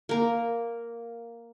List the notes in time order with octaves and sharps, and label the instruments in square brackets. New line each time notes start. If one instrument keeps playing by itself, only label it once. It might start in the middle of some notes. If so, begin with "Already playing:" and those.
[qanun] A#3 A#4